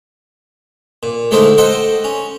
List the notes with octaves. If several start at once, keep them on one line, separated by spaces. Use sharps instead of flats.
A#2
D3 G#3 A3 C4 D#4 E4
A4 C5 D#5 F#5 G5
C#4